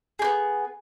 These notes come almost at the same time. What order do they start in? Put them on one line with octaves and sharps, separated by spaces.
G#4 G4 B3